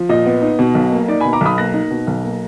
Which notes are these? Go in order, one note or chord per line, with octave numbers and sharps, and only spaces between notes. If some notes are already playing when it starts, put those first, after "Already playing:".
Already playing: F3
A#2 D#5
B3
D#4
B2
B1
A#3
D#4 D5
B2 G#5 B5
A#5 D6
B1 B5 D#6
A#3 F#6 A#6
D#4
B2
B1
A#3